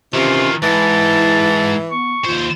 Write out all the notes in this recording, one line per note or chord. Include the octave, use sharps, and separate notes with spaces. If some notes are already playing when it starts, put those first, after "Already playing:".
C3 D#3 E3 C#4 F4
G#2 E3 E4 A5
B3 C#6
D#2 F4 C5